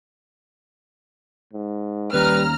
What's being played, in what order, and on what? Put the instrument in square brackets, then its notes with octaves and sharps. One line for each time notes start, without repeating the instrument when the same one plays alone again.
[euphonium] G#2
[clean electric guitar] D#2 C#4 [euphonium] G3 [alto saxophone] B4 [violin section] A#5 F6